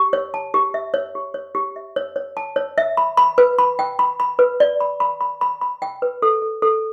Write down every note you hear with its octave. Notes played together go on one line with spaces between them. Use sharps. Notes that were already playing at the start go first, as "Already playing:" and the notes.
Already playing: G4
C#5
A5
G4
E5
C#5
G4
C#5
G4
E5
C#5
C#5
A5
C#5
E5
B5
B5
B4
B5
G5
B5
B5
B4
D5
B5
B5
B5
B5
B5
G5
B4
A4
A4
A4